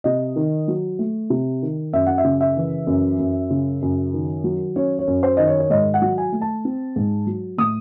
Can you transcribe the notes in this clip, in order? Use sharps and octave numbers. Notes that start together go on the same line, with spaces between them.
C3 D#5
D#3
F#3
A3
C3
D#3
F#2 E5
F#5
E5
C#3
E5
E3
F#2
F#2
C#3
F#2
D#3
F#3
C#4 C#5
C#5
F#2
C5
D#3 D#5
C#5
C#5
G#2 D#5
F#5
F#3
G#5
A3
A5
C4
G#2
F#3
A2 D#6